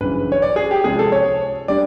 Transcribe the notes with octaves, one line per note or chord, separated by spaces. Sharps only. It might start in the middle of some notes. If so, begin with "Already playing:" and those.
G1 F#2 C#3 E3 B4
C#5
D5
G#4
G4
C#2 C3 F3 G#3 G#4
A4
C#5
D3 G3 D5